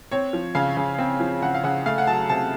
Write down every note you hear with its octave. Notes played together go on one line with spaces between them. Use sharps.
C4 C#5
F3
C#3 F5
C#3
C4
F3
C#3 F#5
F5
C#3 F#5
A3 F5
F#5
F#3 A5
C3 A5